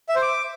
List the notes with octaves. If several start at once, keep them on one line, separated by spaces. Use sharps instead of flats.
E5
C5
D6